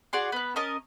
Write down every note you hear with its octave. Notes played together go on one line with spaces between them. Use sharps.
F#4 G#4 D5 C6
B3 B4
C#4 A#4 D#5 A5